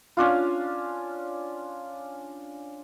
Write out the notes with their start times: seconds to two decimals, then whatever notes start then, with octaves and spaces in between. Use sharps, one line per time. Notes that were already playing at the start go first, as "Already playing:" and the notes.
0.17 C#4 D4 F4